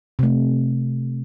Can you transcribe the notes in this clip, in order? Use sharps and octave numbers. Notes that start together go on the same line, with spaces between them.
C3 A3